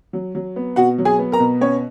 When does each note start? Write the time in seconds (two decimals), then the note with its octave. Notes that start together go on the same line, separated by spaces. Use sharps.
0.13 F#3
0.35 F#3
0.56 B3
0.76 B2 F#4 F#5
0.98 F#3
1.05 G#4 G#5
1.19 B3
1.32 A#4 A#5
1.40 B2
1.61 B3 C#4 C#5